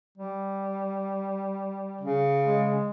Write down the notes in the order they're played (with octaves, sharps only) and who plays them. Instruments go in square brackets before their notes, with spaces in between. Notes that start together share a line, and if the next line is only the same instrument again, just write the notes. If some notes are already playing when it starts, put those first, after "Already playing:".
[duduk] G3
[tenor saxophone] C#3
[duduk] G#3